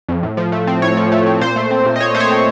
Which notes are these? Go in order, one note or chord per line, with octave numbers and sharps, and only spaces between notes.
F2
A2
F3
A3
C4
A2 C#5
F3
A3
C4
A#2 C5
A3
C4
A#2
D#5
A#2 C#5
A3 C5
C#5
C4